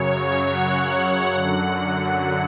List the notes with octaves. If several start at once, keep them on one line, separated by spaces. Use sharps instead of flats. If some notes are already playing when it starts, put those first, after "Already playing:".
Already playing: F#2 C#3 F#3 C#5
F#5
F#2 D3 F#3